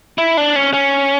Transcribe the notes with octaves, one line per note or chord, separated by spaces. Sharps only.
E4
D4
C#4
C#4